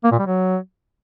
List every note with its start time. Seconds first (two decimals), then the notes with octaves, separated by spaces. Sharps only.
0.04 A#3
0.12 A#2
0.19 G3
0.26 F#3